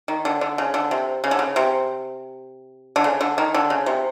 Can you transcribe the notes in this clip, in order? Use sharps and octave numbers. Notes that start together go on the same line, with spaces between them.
D#3
D3
D3
C#3
D3
C3
C#3
D3
C#3
C3
D3
C#3
D3
D#3
D3
C#3
C3